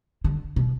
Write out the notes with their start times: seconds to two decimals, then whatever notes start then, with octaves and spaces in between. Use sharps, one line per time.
0.24 D3
0.56 B2